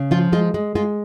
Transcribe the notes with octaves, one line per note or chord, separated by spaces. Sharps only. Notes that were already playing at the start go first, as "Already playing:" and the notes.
Already playing: C#3
F3 F4
G#3 F4
G#3
G#3 F4